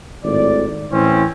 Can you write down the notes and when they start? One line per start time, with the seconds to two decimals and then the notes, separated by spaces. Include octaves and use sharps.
0.24 G#1 A2 D5
0.91 A2 E3 C4 C#4 C5